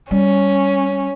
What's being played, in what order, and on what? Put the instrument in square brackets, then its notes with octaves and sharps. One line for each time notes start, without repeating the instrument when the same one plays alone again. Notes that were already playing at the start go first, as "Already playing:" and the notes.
[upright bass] G3 [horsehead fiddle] C#4